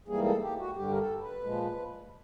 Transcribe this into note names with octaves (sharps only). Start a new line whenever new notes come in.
G#2 E3 G3 A#3 G#4
A4
G4
F#4
G2 D3 G3 G4
A#4
A4
B4
A#2 F3 G#3